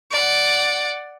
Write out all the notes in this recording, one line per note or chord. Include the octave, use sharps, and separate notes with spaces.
D5 F#5